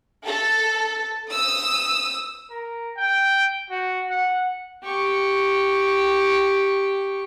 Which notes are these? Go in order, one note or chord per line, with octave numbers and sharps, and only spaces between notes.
A4
D#6 E6
A#4
G5
F#4
F#5
G4 C#6